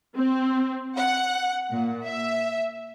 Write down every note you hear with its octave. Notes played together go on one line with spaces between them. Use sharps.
C4
F#5
A#2
E5